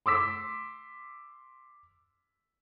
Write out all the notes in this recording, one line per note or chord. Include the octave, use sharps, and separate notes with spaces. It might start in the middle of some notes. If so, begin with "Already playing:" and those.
C6 D6 E6 B6